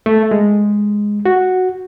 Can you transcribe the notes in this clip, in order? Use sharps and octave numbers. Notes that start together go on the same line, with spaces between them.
A3
G#3
F#4